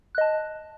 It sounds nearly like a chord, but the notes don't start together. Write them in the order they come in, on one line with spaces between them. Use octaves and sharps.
F#6 D#5 A5